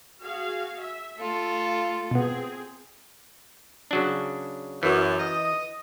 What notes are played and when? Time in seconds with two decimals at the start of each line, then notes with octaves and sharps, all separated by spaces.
0.22 F#4 G#4 F5
0.79 E5
1.19 A3 F4 A4
2.11 B2 B3 C4 G#4
3.91 C#3 F#3 D4
4.83 F#2 E3
5.20 D#5